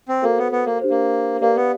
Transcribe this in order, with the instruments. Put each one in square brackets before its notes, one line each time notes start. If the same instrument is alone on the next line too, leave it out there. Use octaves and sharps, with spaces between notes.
[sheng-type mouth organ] C4
[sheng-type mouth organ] A#3 [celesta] F#4 A4 C5
[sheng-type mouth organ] B3
B3
A#3
[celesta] D4 G4 C5
[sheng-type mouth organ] A#3
[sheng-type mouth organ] A#3 [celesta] G4 B4 D5 F5
[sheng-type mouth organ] B3